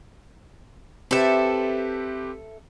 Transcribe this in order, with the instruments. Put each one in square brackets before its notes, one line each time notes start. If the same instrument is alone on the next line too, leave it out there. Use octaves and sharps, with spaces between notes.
[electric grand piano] C4 G4 B4 [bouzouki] A4 E5